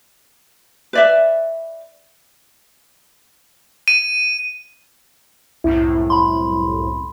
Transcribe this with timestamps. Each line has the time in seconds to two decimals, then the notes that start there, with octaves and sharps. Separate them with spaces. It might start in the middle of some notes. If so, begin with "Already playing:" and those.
0.93 B4 D5 E5
3.88 D#7
5.64 C2 F#2 A2 E4
6.10 B5 C6